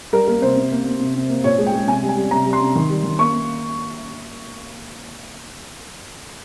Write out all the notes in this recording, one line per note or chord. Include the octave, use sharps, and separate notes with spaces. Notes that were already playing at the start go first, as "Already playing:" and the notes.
G3 A#4
A#3 A#4
C3 C5
C3
A#3
A#3
C3
C3
A#3
A#2 C#5
G#3
G5
G#3
C3 G#5
G3
G#5
G3
C3 A#5
G3
C6
C3
D#3
G3
D#3
A#3 C#6
A#3